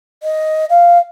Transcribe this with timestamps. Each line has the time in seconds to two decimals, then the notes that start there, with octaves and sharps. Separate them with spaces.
0.23 D#5
0.70 F5